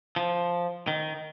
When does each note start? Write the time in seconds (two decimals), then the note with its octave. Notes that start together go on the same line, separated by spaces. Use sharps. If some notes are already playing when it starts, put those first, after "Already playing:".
0.16 F3
0.88 D#3